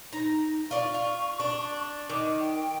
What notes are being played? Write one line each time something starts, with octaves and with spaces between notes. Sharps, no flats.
D#4 A#5
F4 D5 C#6
F4
D4
D#3 D6
G5